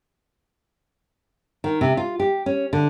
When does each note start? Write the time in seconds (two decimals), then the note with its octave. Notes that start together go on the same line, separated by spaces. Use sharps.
1.64 D#3
1.81 C3
1.97 F4
2.20 G4
2.46 C#4
2.73 D3